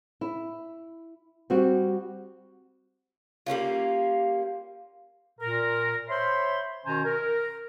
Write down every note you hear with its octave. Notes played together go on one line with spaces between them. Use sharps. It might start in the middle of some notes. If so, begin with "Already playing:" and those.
E4
G3 C4 F#4
G3 A#3 C#4 F4
A#2 A#4
C5 C#5 E5 B5 C6
B2 D#3 C#4 C5 G#5 A#5
A#4